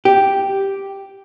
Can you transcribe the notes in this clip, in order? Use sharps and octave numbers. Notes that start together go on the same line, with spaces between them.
G4